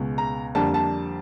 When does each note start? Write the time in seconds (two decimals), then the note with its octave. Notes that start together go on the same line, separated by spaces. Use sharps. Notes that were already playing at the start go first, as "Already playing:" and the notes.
Already playing: C#2 B2 G#3
0.18 A#5
0.55 F2 D3 G3 A#3 A5
0.74 A5